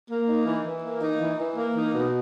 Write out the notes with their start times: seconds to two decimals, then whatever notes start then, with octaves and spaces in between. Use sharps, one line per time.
0.09 A#3
0.28 D#4
0.46 E3
0.65 E3
0.83 A#3
1.01 D#4
1.20 E3
1.39 E3
1.57 A#3
1.76 D#4
1.94 B2